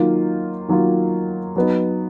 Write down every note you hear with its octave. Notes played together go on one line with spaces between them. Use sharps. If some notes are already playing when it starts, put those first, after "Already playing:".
Already playing: D#3 F#3 A#3 F4
D#3 F#3 A#3 F4
F#3 B3 D#4